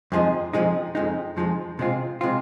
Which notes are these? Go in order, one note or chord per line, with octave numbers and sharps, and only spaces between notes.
F2 F3 G#3 D#4
F2 F3 G#3 D#4
F2 F3 G#3 D#4
F2 F3 G#3 D#4
C3 G#3 C4 F4
C3 G#3 C4 F4